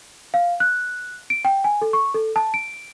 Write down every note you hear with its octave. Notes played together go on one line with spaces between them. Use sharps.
F5
F#6
D7
G5
G#5
A4
C#6
A4
A5
D7